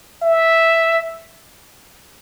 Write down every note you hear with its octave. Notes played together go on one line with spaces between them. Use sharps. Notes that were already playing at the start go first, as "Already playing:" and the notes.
E5